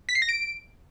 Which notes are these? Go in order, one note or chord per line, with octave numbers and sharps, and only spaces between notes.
B6
C7
A#6
D7